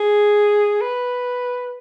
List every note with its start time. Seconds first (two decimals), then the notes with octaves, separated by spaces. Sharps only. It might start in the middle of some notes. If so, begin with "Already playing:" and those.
Already playing: G#4
0.81 B4